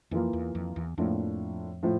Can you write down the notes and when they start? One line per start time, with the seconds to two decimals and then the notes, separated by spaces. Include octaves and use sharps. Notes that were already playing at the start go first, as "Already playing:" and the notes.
0.11 F2 E3 A#3 F4
0.33 E2
0.55 F2
0.76 E2
0.98 F2 A2 F3 A#3 D4 F4
1.83 A2 F3